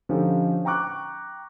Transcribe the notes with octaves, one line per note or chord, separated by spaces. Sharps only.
D3 F3 C#4 D#4 G4
G5 A#5 C#6 D6 F#6